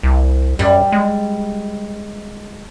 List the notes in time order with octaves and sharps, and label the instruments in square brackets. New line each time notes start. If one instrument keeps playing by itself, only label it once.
[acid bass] C2
[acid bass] F#2 [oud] G3
[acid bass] G#3